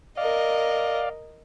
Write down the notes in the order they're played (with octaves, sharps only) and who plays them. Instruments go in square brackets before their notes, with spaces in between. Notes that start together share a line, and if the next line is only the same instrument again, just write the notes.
[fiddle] A#4 D#5 [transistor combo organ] D5 F5